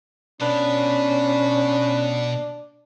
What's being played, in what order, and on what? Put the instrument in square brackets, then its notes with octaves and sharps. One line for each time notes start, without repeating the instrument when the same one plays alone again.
[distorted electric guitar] B2 [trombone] C#4 [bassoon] D4 [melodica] B4